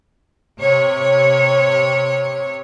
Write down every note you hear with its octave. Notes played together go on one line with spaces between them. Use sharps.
C3 C#5